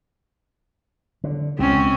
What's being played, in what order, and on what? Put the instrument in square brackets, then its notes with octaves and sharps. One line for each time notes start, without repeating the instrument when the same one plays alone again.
[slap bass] D3
[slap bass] C#2 B2 [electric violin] C4 C#4